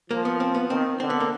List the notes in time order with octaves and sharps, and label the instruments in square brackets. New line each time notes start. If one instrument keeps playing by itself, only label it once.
[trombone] F3 [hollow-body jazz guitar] A#3
[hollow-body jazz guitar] B3
C4
B3
[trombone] D#3 [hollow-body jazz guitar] C4
[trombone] D3 [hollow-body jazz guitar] C4
[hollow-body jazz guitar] B3
A#3